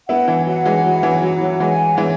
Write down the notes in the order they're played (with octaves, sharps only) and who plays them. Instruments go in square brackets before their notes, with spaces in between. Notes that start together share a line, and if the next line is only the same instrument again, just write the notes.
[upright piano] B3 E4 [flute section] F#5
[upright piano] E3
[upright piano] F#3 [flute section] F#5
[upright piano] E3 G#3
[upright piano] F#3 [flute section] E4
[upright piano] E3
[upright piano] F#3 [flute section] F#5
[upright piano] F#3
[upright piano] E3 G#3 [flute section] G#5
[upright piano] E3 G#3 [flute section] C#5